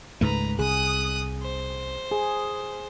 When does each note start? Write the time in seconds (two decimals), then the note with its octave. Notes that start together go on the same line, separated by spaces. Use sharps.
0.21 C#2 G#2 A3 B4 A#5
0.59 C2 G#4 D#6 F#6
1.42 C5
2.12 G#4